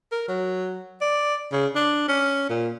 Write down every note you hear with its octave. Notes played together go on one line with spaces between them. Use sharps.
A#4
F#3
D5
C#3
D4
C#4
A#2